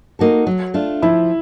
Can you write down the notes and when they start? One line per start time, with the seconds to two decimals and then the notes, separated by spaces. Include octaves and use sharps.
0.19 A#3 D#4 F#4 A4
0.47 F#3
0.74 A3 D4 F4
1.02 F3 E4